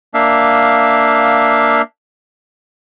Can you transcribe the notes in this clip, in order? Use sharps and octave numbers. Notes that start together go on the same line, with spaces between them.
A#3 D4 E5 F5